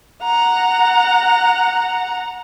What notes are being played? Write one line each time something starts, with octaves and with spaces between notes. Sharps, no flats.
F#5 A#5